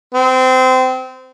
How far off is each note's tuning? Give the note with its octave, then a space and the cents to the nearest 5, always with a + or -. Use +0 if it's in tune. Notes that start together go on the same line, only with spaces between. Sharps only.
C4 -25